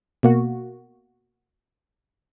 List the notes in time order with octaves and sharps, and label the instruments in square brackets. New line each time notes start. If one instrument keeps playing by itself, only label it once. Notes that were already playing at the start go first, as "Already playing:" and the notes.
[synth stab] B2 A#3 F#4